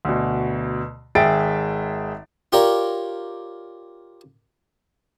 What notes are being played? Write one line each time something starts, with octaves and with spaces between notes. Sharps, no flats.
D2 B2
G#1 G#4 E5 G5 A6 D7
F4 G4 A#4 C#5 D5